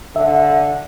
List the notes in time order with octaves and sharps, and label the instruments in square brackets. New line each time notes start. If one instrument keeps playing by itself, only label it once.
[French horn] D3 [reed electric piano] E5